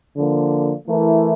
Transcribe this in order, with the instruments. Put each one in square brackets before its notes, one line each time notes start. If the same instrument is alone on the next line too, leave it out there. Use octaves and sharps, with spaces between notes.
[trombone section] D3 F3 A#3
E3 A3 E4 A#4